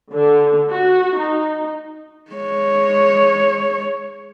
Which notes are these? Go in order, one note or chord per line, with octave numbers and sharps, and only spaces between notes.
D3
F#4
D#4
G#3 C#5